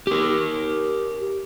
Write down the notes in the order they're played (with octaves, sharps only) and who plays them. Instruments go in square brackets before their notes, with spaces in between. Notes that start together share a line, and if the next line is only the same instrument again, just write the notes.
[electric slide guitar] G4 A#4